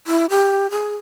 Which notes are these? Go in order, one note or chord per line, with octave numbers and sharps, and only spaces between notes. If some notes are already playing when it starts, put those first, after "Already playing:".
E4
G4
G#4